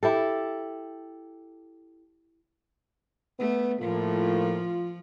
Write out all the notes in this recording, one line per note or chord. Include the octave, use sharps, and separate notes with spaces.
E4 G4 A4
A3 B3
A2 F3 A3 A#3 F4